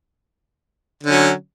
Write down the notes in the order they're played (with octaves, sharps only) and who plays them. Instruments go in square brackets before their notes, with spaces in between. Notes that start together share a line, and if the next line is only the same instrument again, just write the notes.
[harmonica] D3
C#4
F#3